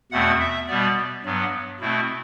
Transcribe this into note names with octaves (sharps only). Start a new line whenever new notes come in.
E2 B2 A3 C4 F#5
E5
B2 G3 B3 D5
G2 F#3 B3
B2 A3 C4 E4